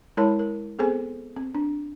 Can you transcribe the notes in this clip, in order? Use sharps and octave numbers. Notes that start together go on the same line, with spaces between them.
G#3 E4 A#4 C#5 A5 B5
A#4
B3 C4 G#4 A4 C5 G#5
C4
D4